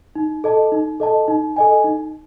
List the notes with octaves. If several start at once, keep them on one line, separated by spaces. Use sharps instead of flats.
D#4
A4 D#5 A5
D#4
A4 D#5 A5
D#4
A4 D#5 G#5
D#4